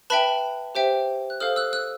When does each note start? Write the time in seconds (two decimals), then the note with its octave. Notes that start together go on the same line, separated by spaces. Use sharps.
0.10 B4 E5 G5 A5 B5
0.75 G4 C5 E5 G5
1.30 F#6
1.40 A4 C5 F5 D#6 F6
1.56 E6 F#6
1.73 E6 F#6